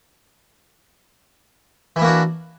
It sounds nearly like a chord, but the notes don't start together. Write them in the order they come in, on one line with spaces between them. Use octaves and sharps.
E3 E4 A#3 F#4 D4